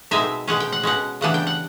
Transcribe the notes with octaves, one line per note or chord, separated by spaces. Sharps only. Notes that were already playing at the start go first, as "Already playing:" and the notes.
B2 G#3 C4 D#4 E5
B2 G#3 C#4 F#5
G5
F#5
B2 G#3 C#4 F#5
C#3 E3 G3 B3 D4 F#5
G5
F#5